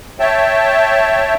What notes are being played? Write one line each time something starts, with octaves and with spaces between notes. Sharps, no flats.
C#5 E5 G5 A5